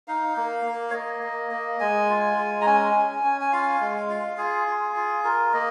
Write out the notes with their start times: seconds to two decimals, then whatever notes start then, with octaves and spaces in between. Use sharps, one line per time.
0.08 D#4 F5
0.37 A#3
0.66 A#3
0.90 C#5
0.94 A#3 D#5
1.23 A#3
1.51 A#3
1.80 G#3 G#5
2.09 F4
2.38 G#3
2.61 A#5
2.66 C#4 G#5
2.95 C#4
3.24 C#4
3.41 G#5
3.52 F4 F5
3.81 G#3
4.09 F4
4.38 F4 G#4
4.68 F4
4.96 F4
5.24 F4 A#4
5.53 A#3 D#5